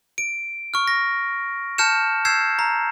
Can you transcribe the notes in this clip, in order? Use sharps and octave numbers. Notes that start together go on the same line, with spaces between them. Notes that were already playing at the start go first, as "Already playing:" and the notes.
D7
C#6 F6
A#6
A5 F6 G6 C#7 E7
E6 G6 G#6 C7 E7
A#5